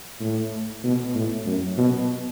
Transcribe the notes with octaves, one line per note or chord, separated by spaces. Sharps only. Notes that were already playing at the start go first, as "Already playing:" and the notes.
A2
B2
A2
F#2
B2